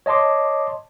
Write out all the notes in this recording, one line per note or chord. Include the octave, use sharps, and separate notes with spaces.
C#5 D#5 A5 C6 D6